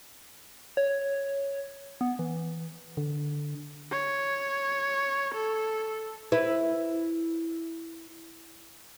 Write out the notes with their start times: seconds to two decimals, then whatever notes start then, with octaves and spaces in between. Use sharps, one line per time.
0.77 C#5
2.01 B3
2.19 E3
2.97 D3
3.92 C#5
5.34 A4
6.32 E4 B4